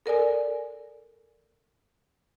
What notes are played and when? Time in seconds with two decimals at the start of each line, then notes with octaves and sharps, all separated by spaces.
0.06 A4 A#4 D5 G#5